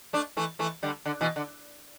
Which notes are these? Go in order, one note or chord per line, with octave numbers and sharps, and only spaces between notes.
A3 D4
E3 A3
E3 A3
D3 G3
D3
B2 E3
D3